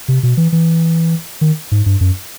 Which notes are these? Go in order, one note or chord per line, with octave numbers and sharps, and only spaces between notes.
C3
B2
E3
E3
D#3
G#2
G2
F#2